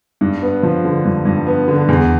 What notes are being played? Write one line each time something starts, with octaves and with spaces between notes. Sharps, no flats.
G2
B3
F3
D3
G2
G2
B3
D3
E2